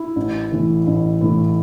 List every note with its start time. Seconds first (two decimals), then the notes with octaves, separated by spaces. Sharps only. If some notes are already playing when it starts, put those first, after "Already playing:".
Already playing: E4
0.16 A1
0.52 A2 E3
0.87 A1
1.21 A2 E3